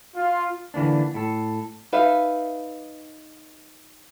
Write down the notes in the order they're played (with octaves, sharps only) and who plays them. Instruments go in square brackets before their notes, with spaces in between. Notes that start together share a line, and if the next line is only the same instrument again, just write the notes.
[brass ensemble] F4
[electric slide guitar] D3 E3 A#3 D4
A2 A4
[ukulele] D#4 B4 E5 F5